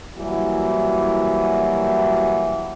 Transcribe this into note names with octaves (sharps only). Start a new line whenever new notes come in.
E3 F#3 G3 A#3 E4 F#4